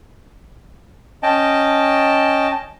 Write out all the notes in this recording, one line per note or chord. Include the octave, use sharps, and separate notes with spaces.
C#4 D#5 G5 A5